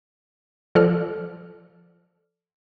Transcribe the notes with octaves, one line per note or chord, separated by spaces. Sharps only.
F3 A4 D5 F6